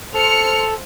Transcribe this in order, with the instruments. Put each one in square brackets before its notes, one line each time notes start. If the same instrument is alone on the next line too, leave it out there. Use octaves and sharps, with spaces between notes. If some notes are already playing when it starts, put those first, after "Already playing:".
[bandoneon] A4 [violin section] C5 F6 C#7